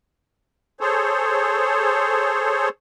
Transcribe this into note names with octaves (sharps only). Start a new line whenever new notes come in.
G#4 A4 C5 C#5